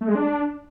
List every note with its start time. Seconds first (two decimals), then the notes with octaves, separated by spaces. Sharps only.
0.01 A3
0.08 G#3
0.15 D4